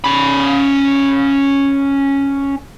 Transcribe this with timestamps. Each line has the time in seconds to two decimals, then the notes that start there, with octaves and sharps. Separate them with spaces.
0.04 C#4 B5